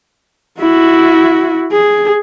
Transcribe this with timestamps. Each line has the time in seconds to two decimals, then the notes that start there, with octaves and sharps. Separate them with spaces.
0.60 E4 F#4
1.72 G#4